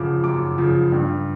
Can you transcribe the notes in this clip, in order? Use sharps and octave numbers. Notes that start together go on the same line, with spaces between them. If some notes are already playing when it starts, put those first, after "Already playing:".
Already playing: F#2 C#3 F3 D6
F#2 D6
C#3 F3
G2